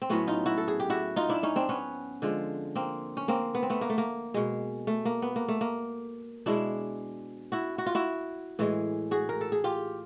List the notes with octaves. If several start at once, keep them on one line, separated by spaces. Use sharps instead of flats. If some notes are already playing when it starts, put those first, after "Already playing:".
C4
A2 F#3 A3 B3 C#4
D#4 F4
E4 F#4
A4
G#4
G4
E4 F#4
D#4 F4
D4 E4
C#4 D#4
C4 D4
B3 C#4
D3 F3 G#3
A#3 C4
C#4
A#3 C4
B3
C4
A3 B3
A#3
A3
A#3
B2 G#3
A3
A#3
B3
A#3
A3
A#3
B2 G#3 D4 E4
E4 F#4
F#4
F4
E4 F#4
A2 E3 G#3
F#4 G#4
A#4
A4
G#4
F4 G4